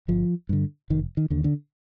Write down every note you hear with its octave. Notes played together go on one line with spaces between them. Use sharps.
G1 F3
G2 D3
F1 D#3
D#3
D#2 D3
D3